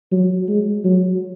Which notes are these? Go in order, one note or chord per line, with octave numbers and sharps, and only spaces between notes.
F#3
G#3
F#3